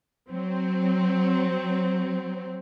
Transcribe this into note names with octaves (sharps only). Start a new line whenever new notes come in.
F#3 C4